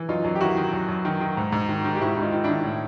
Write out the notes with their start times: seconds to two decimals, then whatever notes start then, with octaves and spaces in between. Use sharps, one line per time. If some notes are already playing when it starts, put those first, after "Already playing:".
Already playing: E3
0.08 F#2 D#4 F4
0.24 F#2
0.35 G4
0.40 D#3 E4 F#4
0.57 D#3
0.73 F#2
0.88 F#2
1.05 D#3
1.21 D#3
1.37 G#2
1.52 G#2
1.69 D#3
1.84 D#3
1.95 G4
2.01 G#2 E4 F#4
2.16 G#2 E4
2.22 D#4 F4
2.32 D#3
2.44 D#3 D4 E4
2.64 A2